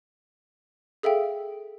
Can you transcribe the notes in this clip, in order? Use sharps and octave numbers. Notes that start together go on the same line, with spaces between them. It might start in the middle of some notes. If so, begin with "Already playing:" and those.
G#4 A4 E5 F5 G5